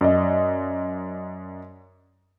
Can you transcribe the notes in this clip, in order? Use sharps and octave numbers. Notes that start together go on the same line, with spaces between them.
F#2 D5 D#5